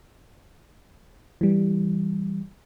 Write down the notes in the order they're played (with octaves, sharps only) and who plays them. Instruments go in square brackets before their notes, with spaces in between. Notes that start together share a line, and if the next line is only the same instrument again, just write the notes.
[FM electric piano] E3 G3